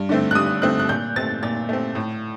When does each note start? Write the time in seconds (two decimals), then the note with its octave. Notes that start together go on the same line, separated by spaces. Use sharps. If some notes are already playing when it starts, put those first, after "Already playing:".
Already playing: G2
0.09 D3 A3 C4
0.31 F#6
0.35 G2 D#6
0.62 D3 A3 C4 F#6
0.79 F#6
0.89 A#2 G6
1.16 A3 C4 A6
1.43 A#2 A6
1.69 A3 C4
1.95 A2